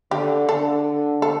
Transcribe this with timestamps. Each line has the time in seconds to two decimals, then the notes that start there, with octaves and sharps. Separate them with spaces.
0.11 D3 G4
0.48 D3 A4
1.22 A4